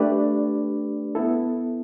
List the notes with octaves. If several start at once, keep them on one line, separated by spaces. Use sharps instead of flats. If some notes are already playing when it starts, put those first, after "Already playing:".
Already playing: A3 D4 G4 B4 D5
B3 E4 A4